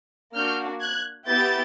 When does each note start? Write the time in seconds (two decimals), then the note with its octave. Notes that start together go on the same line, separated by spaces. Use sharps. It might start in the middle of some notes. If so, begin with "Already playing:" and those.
0.34 A#3 D4 F#4 F6 G6
0.81 F#6 G#6
1.27 B3 E4 G4 G6 A6